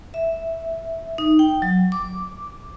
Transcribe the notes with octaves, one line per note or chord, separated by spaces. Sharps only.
E5
D#4
G5
F#3
D6